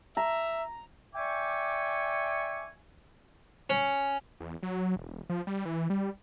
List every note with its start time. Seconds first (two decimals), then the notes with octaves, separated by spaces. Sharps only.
0.17 E5 A#5
1.15 D5 E5 G5 G#5 C#6 D6
3.70 C#4
4.40 E2
4.63 F#3
4.96 E1
5.29 F3
5.47 G3
5.65 E3
5.90 G3